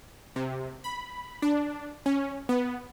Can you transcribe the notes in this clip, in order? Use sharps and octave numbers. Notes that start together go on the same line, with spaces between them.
C3
B5
D4
C#4
B3